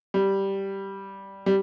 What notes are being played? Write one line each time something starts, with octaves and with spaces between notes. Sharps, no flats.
G3
G3